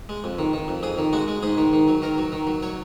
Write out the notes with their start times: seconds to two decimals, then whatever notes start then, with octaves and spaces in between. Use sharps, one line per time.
0.09 G#3
0.24 F2
0.39 D#3
0.54 D#3
0.68 F2
0.83 F2 G#4
0.98 D#3
1.13 G#3 F#4
1.28 G#3
1.43 G#2 G#4
1.58 D#3
1.73 D#3
1.88 F#3
2.02 D#3 A#4
2.18 F#3
2.32 D#3
2.47 F#3
2.63 F#3 C#5